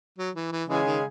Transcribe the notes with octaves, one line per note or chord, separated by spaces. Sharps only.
F#3
E3
E3
C#3 E3 G#3 C#4 G#4
D#3